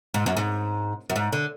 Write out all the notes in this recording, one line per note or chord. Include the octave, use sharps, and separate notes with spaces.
G#2
F#2
G#2
F#2
G#2
D3